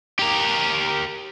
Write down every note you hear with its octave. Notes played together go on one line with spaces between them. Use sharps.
G4 A#4